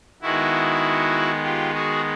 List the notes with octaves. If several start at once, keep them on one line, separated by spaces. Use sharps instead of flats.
D#3 G#3 B3 E4 F#4
F4 G4
F#4 G#4